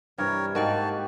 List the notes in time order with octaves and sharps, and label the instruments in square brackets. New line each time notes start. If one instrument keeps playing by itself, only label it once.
[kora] G2 C3 E3 [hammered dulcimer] G3 [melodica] A#4 C#5
[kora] G#2 A#3 [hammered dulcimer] F#4 G4 [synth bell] A#4 D#5 G5 [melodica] A5